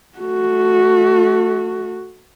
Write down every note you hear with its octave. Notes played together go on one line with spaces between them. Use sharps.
A3 F#4